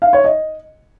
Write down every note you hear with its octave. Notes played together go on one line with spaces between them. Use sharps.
F5
C#5
D#5